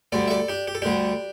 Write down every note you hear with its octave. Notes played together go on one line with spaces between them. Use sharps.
D2 D3 G3 A4 D5
E5
A4 D5
D4 G4
G4
A4
D2 D3 G3 D4 G4